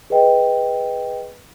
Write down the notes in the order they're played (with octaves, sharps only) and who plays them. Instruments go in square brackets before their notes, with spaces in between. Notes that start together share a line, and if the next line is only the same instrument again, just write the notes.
[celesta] G#4 B4 D#5 G5